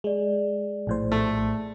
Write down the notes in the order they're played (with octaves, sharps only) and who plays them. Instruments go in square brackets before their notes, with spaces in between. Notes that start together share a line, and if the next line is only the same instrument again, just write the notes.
[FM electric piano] G#3 [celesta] G#4 D5
[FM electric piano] A#1 A2 C5
[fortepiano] A3